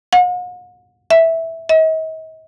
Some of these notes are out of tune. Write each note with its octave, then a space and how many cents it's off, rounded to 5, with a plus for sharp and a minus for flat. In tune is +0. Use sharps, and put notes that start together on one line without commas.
F#5 -45
E5 -10
D#5 +40